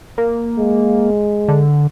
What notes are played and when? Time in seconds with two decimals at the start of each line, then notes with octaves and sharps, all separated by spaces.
0.18 A#3
0.58 G#3
1.48 D3